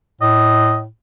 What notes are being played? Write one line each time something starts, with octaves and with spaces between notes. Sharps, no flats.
A2 D#5